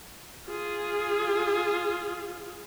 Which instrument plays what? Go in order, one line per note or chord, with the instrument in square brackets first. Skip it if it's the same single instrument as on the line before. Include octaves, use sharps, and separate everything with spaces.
[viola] F4 G#4